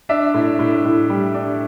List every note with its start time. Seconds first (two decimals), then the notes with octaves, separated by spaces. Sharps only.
0.09 D4 E5
0.34 A2
0.59 A2
0.84 A2
1.10 G3
1.34 D4